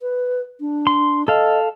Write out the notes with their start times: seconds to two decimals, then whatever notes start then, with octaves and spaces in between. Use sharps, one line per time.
0.01 B4
0.61 D4
0.87 C6
1.28 A4 D#5 F5